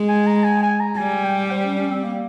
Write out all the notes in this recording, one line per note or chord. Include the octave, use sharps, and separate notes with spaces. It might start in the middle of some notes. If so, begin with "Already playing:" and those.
Already playing: G#3
G#5
A#5
G#5
G#5
A#5
G3 G#5
G5
C5
C#4
C#4
C4
A#3